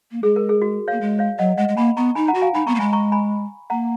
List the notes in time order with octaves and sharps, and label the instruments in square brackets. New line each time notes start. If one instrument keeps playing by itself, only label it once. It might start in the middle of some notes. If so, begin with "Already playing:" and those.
[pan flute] A#3
[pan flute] G#3 [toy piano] G#4
[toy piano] A#4
G#4
F#4
[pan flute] A#3 [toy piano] C#5 F5
[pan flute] G#3
[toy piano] C#5 F5
[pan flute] F#3 [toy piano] D#5 F#5
[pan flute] G#3 [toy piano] D#5 F#5
[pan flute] G#3
[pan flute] A#3 [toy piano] G#5 B5
[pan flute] B3 [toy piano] A#5 C#6
[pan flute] D#4 [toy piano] G#5 B5
[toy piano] F#5 A#5
[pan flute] F#4
[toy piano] F5 G#5
[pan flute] D#4 [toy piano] G#5 B5
[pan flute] B3 [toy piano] A#5 C#6
[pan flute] A#3
[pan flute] G#3 [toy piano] G#5 B5
[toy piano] A#5 C#6
G#5 B5
[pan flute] A#3 [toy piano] F#5 A#5